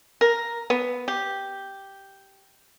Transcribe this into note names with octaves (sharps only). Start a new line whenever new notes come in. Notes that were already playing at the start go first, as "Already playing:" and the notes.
A#4
B3
G4